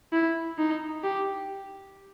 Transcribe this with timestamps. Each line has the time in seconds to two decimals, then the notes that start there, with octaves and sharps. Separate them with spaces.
0.13 E4
0.58 D#4
1.04 G4